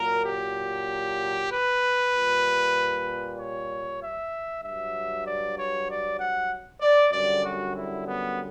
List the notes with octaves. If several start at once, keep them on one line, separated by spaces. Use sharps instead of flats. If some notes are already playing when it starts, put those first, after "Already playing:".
Already playing: A#2 F#3 A#4
G4
B4
A#2 G3
C#5
E5
G2 F#3 E5
D5
C#5
D5
F#5
D5
F#2 D3 G3 D5
F#4
E4
B3